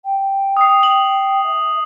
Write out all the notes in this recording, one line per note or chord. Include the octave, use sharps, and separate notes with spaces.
G5
D#6 C7
F#7
E5